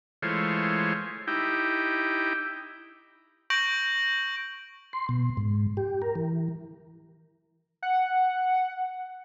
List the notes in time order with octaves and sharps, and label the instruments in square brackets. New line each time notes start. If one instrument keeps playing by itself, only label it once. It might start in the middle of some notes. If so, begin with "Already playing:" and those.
[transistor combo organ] E3 G#3 A3 F4 C5 C#5
D#4 E4 G4 G5
[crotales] C#6 G6 A#6 D7 F#7
[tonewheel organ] C6
B2
G#2
G4
A#4
E3
[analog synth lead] F#5